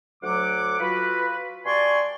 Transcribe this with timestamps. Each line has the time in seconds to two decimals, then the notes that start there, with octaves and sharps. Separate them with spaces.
0.23 D2 F#3 F#5 D6
0.80 F4 F#4 B4
1.66 G2 D5 G#5 C6 C#6